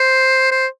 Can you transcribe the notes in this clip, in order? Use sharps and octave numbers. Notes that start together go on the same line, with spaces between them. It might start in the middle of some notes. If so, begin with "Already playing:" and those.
Already playing: C5
C5